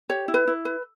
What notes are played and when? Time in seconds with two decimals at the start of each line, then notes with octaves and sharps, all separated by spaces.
0.09 G4 C#5
0.28 E4
0.34 B4
0.47 E4
0.65 B4